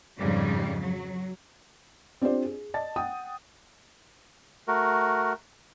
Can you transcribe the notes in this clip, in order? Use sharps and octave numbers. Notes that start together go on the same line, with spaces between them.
F2 G#2 C#3 G3
F#3
C4 D4 F4 G4 C5 D5
G#4
D5 D#5 A5 A6
F#5 G5 D#6
A3 F#4 A#4